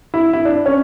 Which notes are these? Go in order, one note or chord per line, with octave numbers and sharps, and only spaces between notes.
E4
E4
D4
C#4